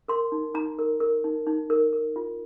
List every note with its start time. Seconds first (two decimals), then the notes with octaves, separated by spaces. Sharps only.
0.08 A#4 C6
0.32 D#4
0.54 D#4 A#5
0.79 A#4
1.00 A#4
1.24 D#4
1.47 D#4
1.70 A#4
1.93 A#4
2.16 F4